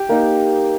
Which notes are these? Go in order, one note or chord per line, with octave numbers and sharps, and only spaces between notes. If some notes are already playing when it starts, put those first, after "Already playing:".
Already playing: G4
A#3 D#4